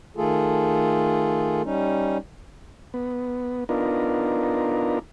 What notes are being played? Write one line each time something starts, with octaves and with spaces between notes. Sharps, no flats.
D#3 A3 F4 G#4 A4
G3 C#4 D#4
B3
B3 D4 D#4 F4 A#4